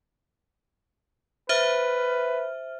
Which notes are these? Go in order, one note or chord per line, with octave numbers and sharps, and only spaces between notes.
B4 C5 E5 F6